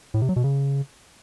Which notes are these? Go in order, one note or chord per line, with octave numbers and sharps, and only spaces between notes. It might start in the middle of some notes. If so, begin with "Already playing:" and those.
A2
C3
F#3
B2
C#3